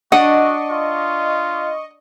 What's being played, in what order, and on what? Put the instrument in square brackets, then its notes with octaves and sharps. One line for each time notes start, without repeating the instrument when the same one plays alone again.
[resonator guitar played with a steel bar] D4 [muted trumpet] F#4 [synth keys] D#5 C#6 [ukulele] F#5
[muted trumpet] F4